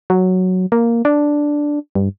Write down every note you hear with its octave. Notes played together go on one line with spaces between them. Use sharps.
F#3
A#3
D4
G2